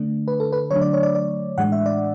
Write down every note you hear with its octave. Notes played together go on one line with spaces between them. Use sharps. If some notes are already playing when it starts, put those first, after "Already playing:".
Already playing: D3 A3 D4
B4
A4
B4
D3 F#3 A3 D4 C#5
D5
C#5
D5
D5
A2 E3 G#3 D4 F#5
E5
D5